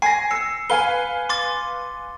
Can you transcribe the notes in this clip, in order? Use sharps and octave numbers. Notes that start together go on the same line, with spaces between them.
G#5 A#6 C7
E6 C#7
B4 F5 G#5 G7
C6 D6 A6